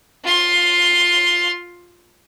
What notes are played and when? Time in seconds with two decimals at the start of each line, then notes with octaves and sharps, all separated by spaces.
0.24 F4 C6